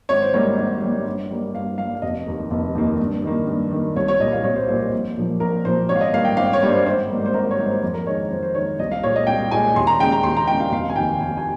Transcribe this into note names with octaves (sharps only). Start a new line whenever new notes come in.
G#1 C#5
C5
G#2 G3 A#3 C#5
G#1
G#2 G3 A#3
G2
G3 A#3
G2 F5
G3 A#3 F5
F5
F1 D#5
D#2 D#3 A#3
F1
D#2 D#3 A#3
G2
D#3 A#3
G2
D#3 A#3
C2 C#5
C#5
A#2 G3 A#3 D#5
F5
C2 C#5
C5
A#2 G3 A#3 C5
C5
A#1
A#2 F3 A#3
A#1 A#4
A#2 F3 A#3 C5
G#1 C#5
F5
D#5
G2 G3 A#3 F5
G5
G#1 F5
C#5
G2 G3 A#3
C5
G#1 C5
G#2 G3 A#3
C5
G#1 A#4
C#5
G#2 G3 A#3
C5
F2
A#4
D#3 G#3 C#5
F2 C5
C5
D#3 G#3 C#5
C2 D#5
F5
A#2 G#3 C#5
D#5
C2 G5
A#2 G#3 G#5
D#2 C6
A#5
C#3 G#3 G5
A#5
D#2 C6
A#5
C#3 G#3 G5
F5
F1 F5
G#5
D#2 D#3 G5
F1 G#5
G#5